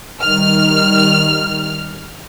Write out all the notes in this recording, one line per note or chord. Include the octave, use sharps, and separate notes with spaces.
D#3 G3 F6